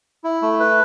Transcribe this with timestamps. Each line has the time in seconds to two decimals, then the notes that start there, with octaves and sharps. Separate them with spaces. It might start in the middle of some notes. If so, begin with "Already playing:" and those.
0.24 E4
0.42 A3
0.60 B4